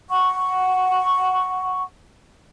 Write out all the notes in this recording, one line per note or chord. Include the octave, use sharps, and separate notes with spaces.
F#5 C#6